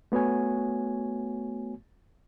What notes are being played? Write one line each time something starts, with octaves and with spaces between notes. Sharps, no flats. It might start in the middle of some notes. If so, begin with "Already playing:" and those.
A3 B3 F#4 C#5 G#5